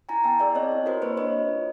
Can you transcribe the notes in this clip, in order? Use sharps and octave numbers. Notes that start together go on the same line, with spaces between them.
E4 G#5 A#5
B3 G5 A5
G#4 D5 E5
C4 C#5 D#5
E4
F#4 A#4 C5
A#3 B4 C#5
D4 C#5 D#5
F#4
F4